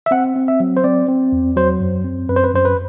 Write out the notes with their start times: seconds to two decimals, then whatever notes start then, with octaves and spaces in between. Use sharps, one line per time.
0.06 E5
0.11 C4 F#5
0.36 C4
0.48 E5
0.60 F#3
0.77 C5
0.84 C4 D5
1.08 C4
1.32 E2
1.56 F#3 C5
1.80 F#2
2.05 C4
2.29 F#2 B4
2.36 C5
2.44 B4
2.53 F#2 C5
2.65 B4